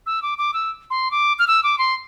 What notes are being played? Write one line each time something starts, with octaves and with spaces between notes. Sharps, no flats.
E6
D6
D6
E6
C6
D6
F6
E6
D6
C6